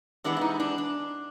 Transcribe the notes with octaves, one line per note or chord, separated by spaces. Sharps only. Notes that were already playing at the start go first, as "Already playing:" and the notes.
C3 E3 G#3 B3 D4
E4
D#4
D4
D4